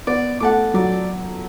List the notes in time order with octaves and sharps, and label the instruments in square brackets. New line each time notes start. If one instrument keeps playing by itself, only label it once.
[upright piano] B3 [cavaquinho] D5
[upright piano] A3 [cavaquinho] F#5 A5 D6
[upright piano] F#3 [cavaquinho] D5